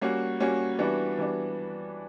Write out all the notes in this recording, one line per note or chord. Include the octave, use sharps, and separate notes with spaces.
G3 A#3 C#4 F#4
G3 A#3 C#4 F#4
E3 G3 B3 D4 F#4
E3 G3 B3 D4